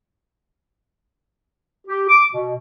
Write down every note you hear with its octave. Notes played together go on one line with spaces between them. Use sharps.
G4
D6
B2